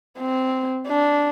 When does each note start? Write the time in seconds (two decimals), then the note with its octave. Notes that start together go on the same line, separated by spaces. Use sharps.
0.19 C4
0.88 D4